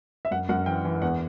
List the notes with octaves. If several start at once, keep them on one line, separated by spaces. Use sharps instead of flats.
E5
F#2 F#5
F#2 F#5
E3 G5
E3
E2 F#5